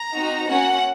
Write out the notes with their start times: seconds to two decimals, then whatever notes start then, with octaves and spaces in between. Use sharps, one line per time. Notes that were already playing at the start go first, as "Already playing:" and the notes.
Already playing: A#5
0.14 C4 D#4 F#4
0.48 A#3 C#4 F#4 F#5